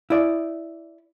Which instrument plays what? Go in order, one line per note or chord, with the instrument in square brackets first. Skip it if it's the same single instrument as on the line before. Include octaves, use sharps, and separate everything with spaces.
[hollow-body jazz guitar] E4 D5